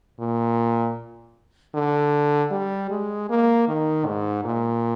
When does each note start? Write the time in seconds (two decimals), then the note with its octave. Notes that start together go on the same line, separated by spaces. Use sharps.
0.20 A#2
1.75 D3
2.51 G3
2.90 G#3
3.29 A#3
3.68 D#3
4.06 G#2
4.45 A#2